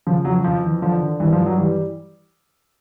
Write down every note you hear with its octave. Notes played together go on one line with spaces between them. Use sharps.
C#3 F3
F2 F#3
F2 F3
E3
D3 F3
D3
G2 E3
F3
G2
F#3
E3 G3